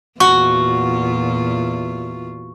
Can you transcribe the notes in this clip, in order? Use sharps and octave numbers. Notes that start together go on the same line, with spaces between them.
E2 A#2 F4 F#4 C#6